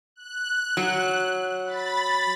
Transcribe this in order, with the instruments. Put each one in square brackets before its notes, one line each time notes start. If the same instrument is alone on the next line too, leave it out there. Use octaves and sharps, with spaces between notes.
[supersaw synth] F#6
[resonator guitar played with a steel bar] F#3
[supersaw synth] B5 A6